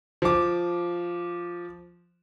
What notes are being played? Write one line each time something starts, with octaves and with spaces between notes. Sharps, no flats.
F3 D6